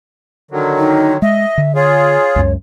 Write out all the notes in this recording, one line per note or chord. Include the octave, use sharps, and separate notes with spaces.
D3 D#3 F#3
D#4
G#3 D#5 E5
D3
F4 G#4 C#5
C#2 F#2